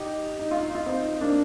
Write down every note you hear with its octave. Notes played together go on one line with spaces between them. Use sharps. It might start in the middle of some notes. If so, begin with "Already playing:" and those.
Already playing: D#4 G4
D#4
F4
D#4
F4
C4 D#4
A#3 D4